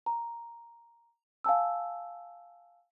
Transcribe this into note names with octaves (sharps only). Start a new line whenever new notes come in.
A#5
F5 G#5 A5 E6